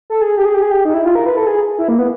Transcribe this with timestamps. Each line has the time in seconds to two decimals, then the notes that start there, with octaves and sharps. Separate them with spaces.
0.10 A4
0.22 G#4
0.37 G4
0.45 G#4
0.54 G4
0.62 G#4
0.71 G4
0.85 D#4
0.94 E4
1.05 F4
1.15 A#4
1.26 B4
1.37 A4
1.47 G#4
1.78 E4
1.88 A#3
1.98 B3